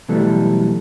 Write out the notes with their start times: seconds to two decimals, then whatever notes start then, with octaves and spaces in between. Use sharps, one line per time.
0.08 B2 E3 F#3 G3 A3 A4